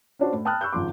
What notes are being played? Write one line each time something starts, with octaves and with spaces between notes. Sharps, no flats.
C#4 D4 F#4 C5
A2
G5 A5 B5 D#6 F6 F#6
B5 C#6 E6 F#6 G6
G#1 C#3 F3 C6 D6